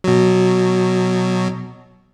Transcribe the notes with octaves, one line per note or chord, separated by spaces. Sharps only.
B2 F#3